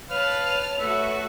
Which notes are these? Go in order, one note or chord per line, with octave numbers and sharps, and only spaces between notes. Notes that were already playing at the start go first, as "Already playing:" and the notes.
B4 C#5 F5 A5 F6
A3 F#4 B4 E5